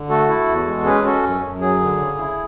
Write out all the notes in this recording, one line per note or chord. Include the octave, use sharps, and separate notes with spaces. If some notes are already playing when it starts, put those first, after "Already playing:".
Already playing: D3
A3 F#4 A4
E4
E2
G#3
C#4 G#4 B4
C#4 F#4 A4
F#2
F#2
F#3 G#4
D3
C#3
E4